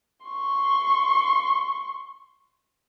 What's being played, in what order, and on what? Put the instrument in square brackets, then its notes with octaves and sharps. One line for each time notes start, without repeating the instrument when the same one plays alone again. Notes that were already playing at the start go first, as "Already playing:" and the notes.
[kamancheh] C6 C#6